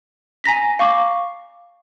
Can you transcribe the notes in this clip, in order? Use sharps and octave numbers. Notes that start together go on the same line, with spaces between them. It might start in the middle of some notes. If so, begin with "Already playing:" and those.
G#5 A#5 A#6 B6
F5 C#6 D6